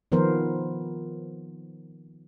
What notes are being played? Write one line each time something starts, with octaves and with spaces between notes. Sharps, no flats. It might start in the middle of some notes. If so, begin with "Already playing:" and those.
D#3 F3 B3 A#4 C5